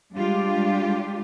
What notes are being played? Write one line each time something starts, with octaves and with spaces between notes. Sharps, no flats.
G3 G#3 D4 F4 G4